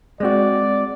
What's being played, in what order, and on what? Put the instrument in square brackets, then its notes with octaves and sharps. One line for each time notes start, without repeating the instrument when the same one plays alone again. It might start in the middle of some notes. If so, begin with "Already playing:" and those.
[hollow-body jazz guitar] G#3 C4 F#4 [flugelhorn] D5